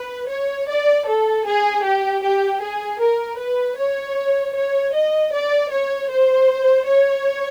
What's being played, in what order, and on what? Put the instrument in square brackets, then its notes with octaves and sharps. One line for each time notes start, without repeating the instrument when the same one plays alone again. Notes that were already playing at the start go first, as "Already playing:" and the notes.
Already playing: [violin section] B4
C#5
D5
A4
G#4
G4
G4
G#4
A#4
B4
C#5
C#5
D#5
D5
C#5
C5
C#5